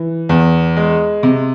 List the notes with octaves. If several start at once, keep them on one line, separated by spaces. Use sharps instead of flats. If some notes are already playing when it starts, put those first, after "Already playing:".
Already playing: E3
E2
G#3
C3